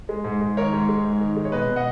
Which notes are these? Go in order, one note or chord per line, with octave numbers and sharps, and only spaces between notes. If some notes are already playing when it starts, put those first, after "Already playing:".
G#3
G#2
G#2
D#3 A#4 C#5
G#2
G#3
G#2
D#3
G#3
C#5
B2 B4 D#5
B2
D#5 F#5